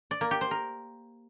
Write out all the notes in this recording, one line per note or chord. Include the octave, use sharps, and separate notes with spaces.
D5
A#3
G4
C5
A#4